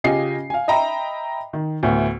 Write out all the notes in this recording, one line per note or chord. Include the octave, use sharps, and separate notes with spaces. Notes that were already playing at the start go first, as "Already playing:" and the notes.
C#3 F4 G4 D#5 G#5 C7
F5 G#5
D#5 E5 G5 A#5 B5
D#3
D2 A2 B3